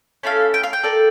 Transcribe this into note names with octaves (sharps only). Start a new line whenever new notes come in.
A3 C#4 E4 A4 F5
G5
F5
G5
A#3 D4 A4